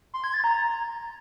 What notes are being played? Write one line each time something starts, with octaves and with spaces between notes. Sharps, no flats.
C6
G#6
A6
A#5